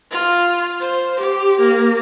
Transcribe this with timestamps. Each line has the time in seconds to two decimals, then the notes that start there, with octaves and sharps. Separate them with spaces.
0.11 F4
0.80 C5
1.20 G4
1.60 A#3